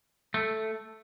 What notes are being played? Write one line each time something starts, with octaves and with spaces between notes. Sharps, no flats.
A3